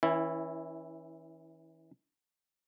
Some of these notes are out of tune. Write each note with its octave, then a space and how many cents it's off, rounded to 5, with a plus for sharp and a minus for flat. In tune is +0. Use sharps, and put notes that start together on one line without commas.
E3 -30 C#4 +0 E4 +0